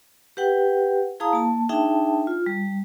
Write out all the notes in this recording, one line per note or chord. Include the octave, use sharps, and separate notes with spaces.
G4 B4 F#5 G5
E4 G#4 F5 A5 A#5 D#6
A#3 A5
D4 D#4 G#4 E5 G5 A5
F4
G3